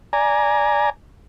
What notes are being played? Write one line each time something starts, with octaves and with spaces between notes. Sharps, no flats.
D5 G#5 A#5